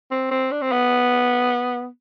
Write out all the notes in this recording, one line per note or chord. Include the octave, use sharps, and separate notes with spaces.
C4
C4
D4
C4
B3